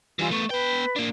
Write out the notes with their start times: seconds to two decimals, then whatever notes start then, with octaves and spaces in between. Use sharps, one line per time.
0.19 E3 G3 E4 F4 G#5
0.31 A3 B3 C#6
0.50 B3 B4 G5
0.96 A#3 D4